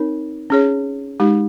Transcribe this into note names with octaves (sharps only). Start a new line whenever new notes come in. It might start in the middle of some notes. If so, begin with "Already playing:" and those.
Already playing: C4 D#4 A#4 C#5
C#4 G#4 C#5
G#3 D#4 G4